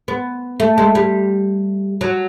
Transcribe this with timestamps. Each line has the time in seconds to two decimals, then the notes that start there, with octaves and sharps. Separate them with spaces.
0.08 B3
0.60 A3
0.78 G#3
0.95 G3
2.01 F#3